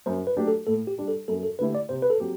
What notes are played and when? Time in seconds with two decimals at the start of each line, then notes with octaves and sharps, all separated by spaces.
0.06 F#2 C5
0.27 B4
0.37 F#3 A3 D4 G4
0.47 A4
0.67 A2 A4
0.87 G4
0.98 G3 D4
1.08 A4
1.28 F#2 A4
1.43 A4
1.59 D3 A3 E4 G4 B4
1.75 D5
1.89 C3 C5
2.02 B4
2.10 A4
2.20 F#3 C4 G4